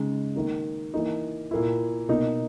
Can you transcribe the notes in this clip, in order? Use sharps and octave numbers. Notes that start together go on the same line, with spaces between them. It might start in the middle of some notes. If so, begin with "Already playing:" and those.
Already playing: C#3 G#3 D#4
D#3 A#3 D#4
E3 A#3 D#4
A#2 A#3 E4
B2 A#3 D#4